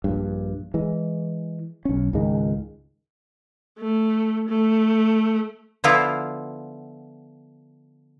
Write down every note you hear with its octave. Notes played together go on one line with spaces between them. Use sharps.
A#1 G2
E3 G#3
B1 C#4
C#2 G#2 D#3 G#3
A3
A3
D3 F3 B3 E4 F4